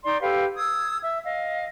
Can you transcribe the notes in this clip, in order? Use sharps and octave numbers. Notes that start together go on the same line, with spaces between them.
D#4 D5 C6
G4 A4 B4 F5
D#6 E6 G#6
E5 E6
D#5 F5